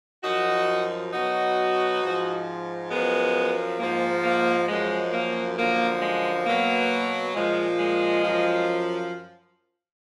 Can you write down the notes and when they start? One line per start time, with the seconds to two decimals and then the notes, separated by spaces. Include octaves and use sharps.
0.24 F#2 F3 D#4 F#4
1.13 B2 F#3 D#4 F#4
2.02 G#2 F3
2.91 F#2 F3 G#3 B3
3.79 G#2 F3 A#3
4.24 A#3
4.68 F#2 F3 G#3
5.12 A#3
5.57 F#2 D3 F3 A#3
6.01 G#3
6.46 B2 F#3 A#3
7.34 A#2 F3 G#3
7.79 G#3
8.24 F#2 F3